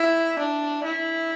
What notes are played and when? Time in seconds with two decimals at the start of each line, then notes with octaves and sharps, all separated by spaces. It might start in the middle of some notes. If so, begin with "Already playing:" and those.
Already playing: E4
0.39 D4
0.84 E4